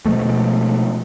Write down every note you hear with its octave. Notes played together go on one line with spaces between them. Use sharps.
B2 F3 G#3 A3